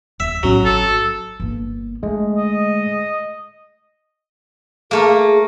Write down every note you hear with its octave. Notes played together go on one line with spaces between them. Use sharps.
D#1 E5
B1 A2 F#3 C#4
G#1 A4
G1 A#3
D3 G#3 A3
D#5
A3 A#3 G#4